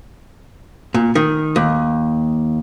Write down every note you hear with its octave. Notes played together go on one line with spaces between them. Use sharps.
A#2
D#3
D#2